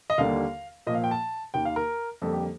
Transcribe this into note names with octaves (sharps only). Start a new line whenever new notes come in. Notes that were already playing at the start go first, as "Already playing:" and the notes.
D#5
D#2 D3 G3 A#3 F5
A#2 F3 A#3 D#5
F5
G5
A5
D#2 D#3 A#3 G5
F5
A#4
F2 D3 G3 A#3 A4
G4